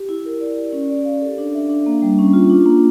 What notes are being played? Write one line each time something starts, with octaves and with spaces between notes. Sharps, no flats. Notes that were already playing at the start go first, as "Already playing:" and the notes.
Already playing: G4
E4
A#4
D5
G4
C#4
D5
F5
A4
D4
E5
D4
A#3
G3
C#4
F4
D4
A#3